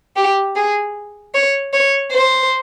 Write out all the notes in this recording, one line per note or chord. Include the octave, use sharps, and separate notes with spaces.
G4
G#4
C#5
C#5
C5